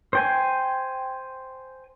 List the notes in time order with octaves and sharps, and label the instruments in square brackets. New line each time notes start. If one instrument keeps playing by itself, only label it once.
[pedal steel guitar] C5 G5 G#5